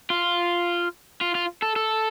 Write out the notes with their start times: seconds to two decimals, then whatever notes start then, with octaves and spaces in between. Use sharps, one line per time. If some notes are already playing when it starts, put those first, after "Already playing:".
0.10 F4
1.21 F4
1.35 F4
1.62 A4
1.76 A4